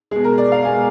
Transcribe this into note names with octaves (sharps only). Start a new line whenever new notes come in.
B2 G#3 G#4
A#4
D5
F5
B2 G#3 G#5